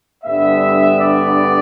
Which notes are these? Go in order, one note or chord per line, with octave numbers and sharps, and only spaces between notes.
G2 D3 G3 B3 E5
D5